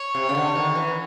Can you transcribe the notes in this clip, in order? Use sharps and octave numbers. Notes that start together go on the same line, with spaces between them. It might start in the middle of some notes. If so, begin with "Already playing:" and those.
Already playing: C#5
C3
C#3
D3
D#3
E3